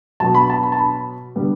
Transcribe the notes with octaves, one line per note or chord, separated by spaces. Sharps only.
B2 F#3 B3 A5
B5
A5
B5
A5
B5
D3 G3 B3